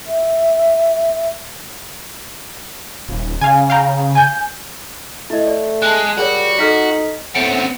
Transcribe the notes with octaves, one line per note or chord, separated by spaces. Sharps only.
E5
D#1
C#3 F5 G#5
F5 G5 A#5
G#5 G6
A3 E4 D#5
D5
G#3 A5 F#6
G3 F#4 G#4 A#4 C#5
D#4 A4 F6 B6
A2 B3 C4 C#7 D7